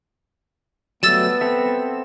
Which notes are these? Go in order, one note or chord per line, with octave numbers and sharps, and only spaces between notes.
F#3 G3 A3 B3 E6 A6 E7
C4 A4 E5